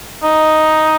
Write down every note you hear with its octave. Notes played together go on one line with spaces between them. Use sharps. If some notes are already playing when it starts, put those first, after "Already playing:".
D#4